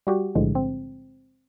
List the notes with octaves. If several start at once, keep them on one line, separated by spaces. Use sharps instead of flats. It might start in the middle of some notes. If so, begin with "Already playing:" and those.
G3 F#4 G4
B1 A2 D3 F3 G#3
C4